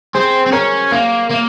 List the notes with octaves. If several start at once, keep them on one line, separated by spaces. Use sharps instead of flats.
C4 G#4 C5
C4
C#4 A#4 C#5
A#3
A#3